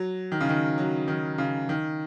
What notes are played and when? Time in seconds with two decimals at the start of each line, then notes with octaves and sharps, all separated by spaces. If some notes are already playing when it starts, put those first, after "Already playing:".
Already playing: F#3
0.32 D#3
0.40 C#3
0.49 D#3
0.78 F#3
1.08 D#3
1.38 C#3
1.69 D#3